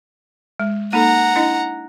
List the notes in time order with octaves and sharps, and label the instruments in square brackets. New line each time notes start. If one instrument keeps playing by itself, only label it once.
[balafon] G#3
[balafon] A#3 D#4 A4 [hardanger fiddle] F#5 A#5
[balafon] D4 E4 D#5